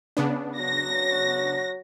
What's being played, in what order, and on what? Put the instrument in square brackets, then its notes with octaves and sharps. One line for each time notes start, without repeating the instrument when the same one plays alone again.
[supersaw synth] C#3 B3 D4
[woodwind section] F#3 F#4 [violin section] A#6